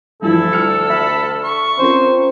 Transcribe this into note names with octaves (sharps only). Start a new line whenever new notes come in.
D2 G2 E3 F3 E4 A4
E6 F6 C#7
E5 B5 F6
C#6
C4 C#4 F4 A#4 C5